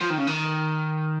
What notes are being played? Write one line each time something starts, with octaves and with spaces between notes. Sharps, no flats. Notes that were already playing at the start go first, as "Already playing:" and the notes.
F3
D#3
C#3
D#3